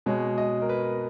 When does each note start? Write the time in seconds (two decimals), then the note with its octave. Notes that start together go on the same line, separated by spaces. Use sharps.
0.06 B2 G#3 C#5
0.38 D#5
0.62 A#4
0.69 B4